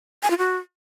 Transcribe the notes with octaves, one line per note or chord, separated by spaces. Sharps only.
G#5
F4
F#4